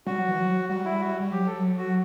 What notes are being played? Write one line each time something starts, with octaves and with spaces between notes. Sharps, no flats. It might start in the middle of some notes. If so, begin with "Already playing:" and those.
G3 F#4
F#3
E3
F#3
G3 F#4
E4
F#4
G3
F#3 G4
A4
F#4